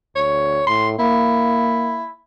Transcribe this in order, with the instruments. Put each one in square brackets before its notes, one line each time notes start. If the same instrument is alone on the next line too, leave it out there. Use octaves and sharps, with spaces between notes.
[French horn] D2 [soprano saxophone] C#5
[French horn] A2 [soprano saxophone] C6
[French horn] A#3 [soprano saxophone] E4